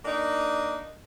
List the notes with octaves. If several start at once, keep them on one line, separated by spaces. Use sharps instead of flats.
A#3 D4 D#4